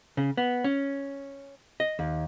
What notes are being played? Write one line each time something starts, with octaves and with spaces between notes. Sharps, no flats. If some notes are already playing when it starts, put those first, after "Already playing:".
C#3
B3
C#4
D#5
D#2